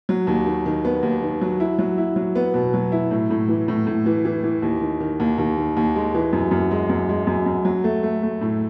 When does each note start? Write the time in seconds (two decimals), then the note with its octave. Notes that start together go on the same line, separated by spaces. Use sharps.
0.09 F#3
0.27 D#2
0.46 D#3
0.66 D#3
0.85 B3
1.03 D#2
1.22 D#3
1.41 F#3
1.60 E4
1.79 F#3
1.98 E4
2.16 F#3
2.35 B3
2.54 B2
2.74 F#3
2.92 E4
3.11 A2
3.30 A2
3.48 E3
3.68 A2
3.87 A2
4.06 E3
4.25 E3
4.43 E3
4.62 D#2
4.82 D#3
5.00 D#3
5.20 D#2
5.38 D#2
5.57 D#3
5.77 D#2
5.96 G#3
6.14 E3
6.33 F#2
6.51 F#2
6.71 G#3
6.89 F#2
7.09 G#3
7.27 F#2
7.46 F#2
7.65 F#3
7.84 A3
8.03 A3
8.23 A3
8.41 A2